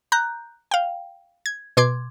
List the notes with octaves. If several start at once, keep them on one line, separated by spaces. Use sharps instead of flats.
A#5 F#6 G6
F5 G5
G#6
B2 C6 D6 G#6